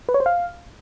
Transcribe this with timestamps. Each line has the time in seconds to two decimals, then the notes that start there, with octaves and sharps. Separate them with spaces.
0.09 B4
0.14 C#5
0.20 C5
0.26 F5